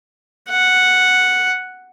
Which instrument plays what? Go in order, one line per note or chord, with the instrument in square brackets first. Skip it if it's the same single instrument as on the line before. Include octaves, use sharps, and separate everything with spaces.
[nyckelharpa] F#5